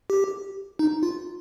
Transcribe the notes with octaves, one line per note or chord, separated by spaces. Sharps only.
G4
D#4
F4